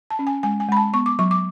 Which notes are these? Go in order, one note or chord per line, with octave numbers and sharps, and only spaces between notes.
A5
C#4
G#5
G#3 G#5
G#5
G#3 B5
A5
B3 C#6
D6
F#3 C#6
D6